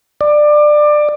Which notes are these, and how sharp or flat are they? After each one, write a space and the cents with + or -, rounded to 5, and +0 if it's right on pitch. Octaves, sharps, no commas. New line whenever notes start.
D5 +20